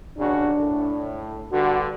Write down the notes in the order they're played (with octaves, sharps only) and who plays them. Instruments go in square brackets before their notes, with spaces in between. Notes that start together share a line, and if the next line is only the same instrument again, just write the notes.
[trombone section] D#2 C#3 F#4 [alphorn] D4
[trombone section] A2
[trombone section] G2 D3 [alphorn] F#4